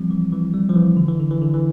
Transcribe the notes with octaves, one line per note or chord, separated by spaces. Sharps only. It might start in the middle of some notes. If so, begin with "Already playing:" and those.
Already playing: F3 G3 C4
E3
E3
G3
F3
E3
D3
E3
D3
E3
D3
E3